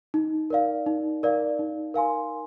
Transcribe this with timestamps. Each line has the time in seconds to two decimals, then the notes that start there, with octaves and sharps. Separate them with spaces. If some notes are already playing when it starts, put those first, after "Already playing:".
0.14 D#4
0.50 A#4 D5 F5
0.86 D#4
1.23 A#4 D5 F5
1.59 D#4
1.94 A#4 F5 G#5 C6